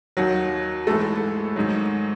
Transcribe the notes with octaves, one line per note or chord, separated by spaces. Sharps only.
D#2 D#3 F#3 F#4
G#2 E3 G#3 A3 A4
G#2 D#3 F#3